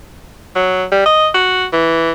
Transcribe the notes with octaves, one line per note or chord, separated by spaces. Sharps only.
F#3
G3
D#5
F#4
E3